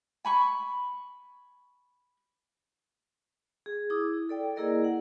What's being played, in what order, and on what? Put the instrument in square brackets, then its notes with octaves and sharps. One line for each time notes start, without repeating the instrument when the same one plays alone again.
[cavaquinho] G#5 B5 C#6
[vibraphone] G#4
E4 G#4 D6 D#6
A4 D5 G5
A#3 E4 G#4 A#4 D5 D#5
F#5